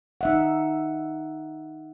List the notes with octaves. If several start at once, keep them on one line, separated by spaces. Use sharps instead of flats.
D#4 E5 F#5